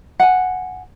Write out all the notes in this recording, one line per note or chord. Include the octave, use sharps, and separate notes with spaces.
F#5 G#5